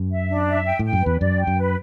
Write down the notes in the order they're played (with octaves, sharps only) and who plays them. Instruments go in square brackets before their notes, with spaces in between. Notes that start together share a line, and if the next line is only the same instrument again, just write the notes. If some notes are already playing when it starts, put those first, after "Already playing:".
Already playing: [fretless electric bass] F#2
[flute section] E5
D4
E5
G5
[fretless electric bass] A2 [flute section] G5
[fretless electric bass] F#2
[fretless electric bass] E2 [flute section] B4
[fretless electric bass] F#2 [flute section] D5
[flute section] G5
[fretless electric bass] F#2
[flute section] B4